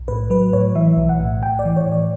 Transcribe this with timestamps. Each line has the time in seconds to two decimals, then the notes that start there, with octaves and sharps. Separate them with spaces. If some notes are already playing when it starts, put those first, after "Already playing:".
Already playing: B1
0.08 A2 B4
0.30 F#3 B4
0.53 A2 C#5
0.75 E3 E5
0.97 B1
1.09 F#5
1.20 A2
1.42 A2 G5
1.59 D5
1.65 E3
1.76 C#5
1.86 A2
1.92 D5